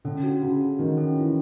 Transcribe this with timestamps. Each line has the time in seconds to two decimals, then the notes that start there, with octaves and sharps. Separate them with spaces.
0.05 D3 C#4
0.24 F#4
0.42 C#3 F#4
0.61 F#4
0.79 D#3 F#4
0.98 C#4
1.16 E3 C#4